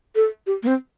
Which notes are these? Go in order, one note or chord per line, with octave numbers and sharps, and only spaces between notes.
A4
G4
A#3
C4